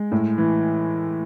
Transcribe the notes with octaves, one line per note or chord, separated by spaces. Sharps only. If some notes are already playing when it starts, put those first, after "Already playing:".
Already playing: G#3
A2
E3